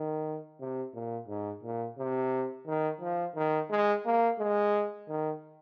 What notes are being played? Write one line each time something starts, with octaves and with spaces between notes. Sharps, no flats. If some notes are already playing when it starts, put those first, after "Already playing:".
Already playing: D#3
C3
A#2
G#2
A#2
C3
D#3
F3
D#3
G#3
A#3
G#3
D#3